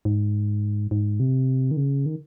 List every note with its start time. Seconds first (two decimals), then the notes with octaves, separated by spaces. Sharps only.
0.05 G#2
0.91 G#2
1.20 C3
1.71 D#3
1.77 C#3
2.06 D#3